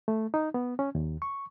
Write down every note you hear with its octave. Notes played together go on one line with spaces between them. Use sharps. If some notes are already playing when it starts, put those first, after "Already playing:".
A3
D#4
B3
C#4
D#2
C#6